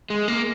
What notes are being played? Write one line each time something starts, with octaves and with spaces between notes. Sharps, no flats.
G#3
A#3